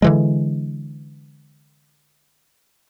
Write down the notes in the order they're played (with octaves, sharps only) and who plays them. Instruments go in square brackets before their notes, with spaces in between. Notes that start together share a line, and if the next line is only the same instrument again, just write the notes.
[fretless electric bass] D3 E3 G#3